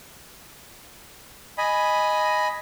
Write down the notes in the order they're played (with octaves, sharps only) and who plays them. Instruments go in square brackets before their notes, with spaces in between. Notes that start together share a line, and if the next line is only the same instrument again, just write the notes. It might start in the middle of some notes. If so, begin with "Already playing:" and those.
[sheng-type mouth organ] D#5 G#5 B5